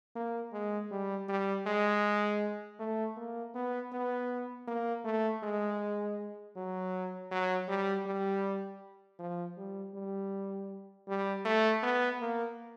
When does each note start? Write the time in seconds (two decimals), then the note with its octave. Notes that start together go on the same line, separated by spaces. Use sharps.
0.16 A#3
0.53 G#3
0.91 G3
1.29 G3
1.66 G#3
2.79 A3
3.17 A#3
3.54 B3
3.92 B3
4.67 A#3
5.04 A3
5.42 G#3
6.56 F#3
7.31 F#3
7.68 G3
8.06 G3
9.19 F3
9.57 G3
9.95 G3
11.08 G3
11.45 A3
11.83 B3
12.20 A#3